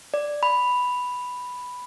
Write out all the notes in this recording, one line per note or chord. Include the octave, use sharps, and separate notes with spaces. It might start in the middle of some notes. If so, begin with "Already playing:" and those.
D5
B5